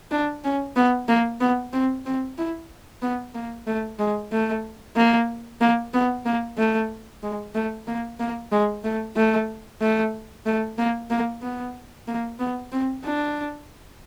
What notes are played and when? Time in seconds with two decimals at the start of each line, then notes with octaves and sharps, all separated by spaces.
0.11 D4
0.44 C#4
0.76 B3
1.08 A#3
1.41 B3
1.73 C4
2.06 C4
2.38 E4
3.02 B3
3.35 A#3
3.67 A3
3.99 G#3
4.32 A3
4.96 A#3
5.61 A#3
5.93 B3
6.25 A#3
6.58 A3
7.23 G#3
7.55 A3
7.87 A#3
8.20 A#3
8.52 G#3
8.84 A3
9.16 A3
9.81 A3
10.46 A3
10.78 A#3
11.10 A#3
11.43 B3
12.07 A#3
12.39 B3
12.72 C4
13.04 D4